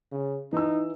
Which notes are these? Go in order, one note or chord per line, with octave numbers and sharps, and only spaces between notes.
C#3
E3 D#4 E6